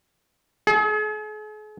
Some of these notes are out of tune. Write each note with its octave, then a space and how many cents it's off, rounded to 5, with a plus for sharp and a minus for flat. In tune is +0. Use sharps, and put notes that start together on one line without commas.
G#4 +45